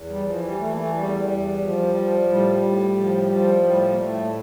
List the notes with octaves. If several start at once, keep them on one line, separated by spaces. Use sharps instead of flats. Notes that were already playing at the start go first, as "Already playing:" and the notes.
Already playing: E2
G3
E3 F3
G3
E3 A3
A#3
A3
E2 G3
E2
F3
F3
A2 G3
A2
F3
F3
A2 G3
A#3
A2 A3